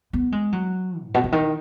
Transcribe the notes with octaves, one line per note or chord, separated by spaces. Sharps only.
B3
G#3
F#3
G#2
B2
C#3
D#3